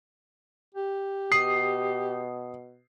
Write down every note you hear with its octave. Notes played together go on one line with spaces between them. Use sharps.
G4
B2 D#6 C7